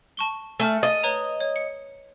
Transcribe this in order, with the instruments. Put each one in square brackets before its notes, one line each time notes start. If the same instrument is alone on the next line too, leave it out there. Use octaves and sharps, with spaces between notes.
[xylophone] A5 C#6 G7
[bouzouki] A3 [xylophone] G#5 A5 F6
[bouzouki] D#5 [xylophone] A6
[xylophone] B4 C#5 A#5
C#5
C#7